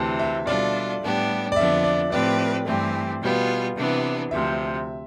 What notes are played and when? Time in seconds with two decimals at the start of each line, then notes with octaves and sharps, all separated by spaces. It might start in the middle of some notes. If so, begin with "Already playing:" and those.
Already playing: D2 C3 E3 A5
0.19 E5
0.47 B2 G3 D4 F4 A4 D5
1.02 A2 G3 B3 D4 G4
1.52 D5
1.56 F2 D3 F3 B3 D4 E5
1.84 D5
2.12 A2 F3 C4 G4 B4 D5
2.66 G2 E3 A3 C4 G4
3.22 B2 G3 B3 F4
3.76 C3 E3 B3 D4
4.31 D2 C3 F3 E5